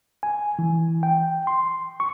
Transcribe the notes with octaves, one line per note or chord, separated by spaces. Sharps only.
G#5
E3
G5
C6
C#6